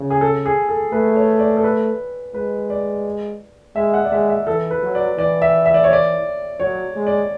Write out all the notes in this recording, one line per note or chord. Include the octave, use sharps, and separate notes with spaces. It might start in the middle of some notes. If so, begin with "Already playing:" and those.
Already playing: C#3
G#4
A4
G#4
A4
A3 B4
C#5
D5
A4
B4
G#3 B4
D5
G#3 E5
F#5
D5
G#3 E5
E5
E3 A4
B4
F#3
D5
E3 D5
E5
E5
D5
C#5
D5
F#3 C#5
G#3
D5